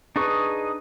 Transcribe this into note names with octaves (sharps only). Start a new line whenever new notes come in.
D4 D#4 G#4 B4 C#6